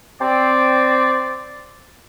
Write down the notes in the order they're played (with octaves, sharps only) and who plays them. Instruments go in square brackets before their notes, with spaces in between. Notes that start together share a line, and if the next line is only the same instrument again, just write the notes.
[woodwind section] C4 D5